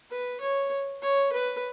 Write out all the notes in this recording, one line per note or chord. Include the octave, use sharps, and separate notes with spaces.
B4
C#5
C#5
B4